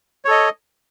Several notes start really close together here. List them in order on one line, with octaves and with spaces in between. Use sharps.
C#5 A4 D#5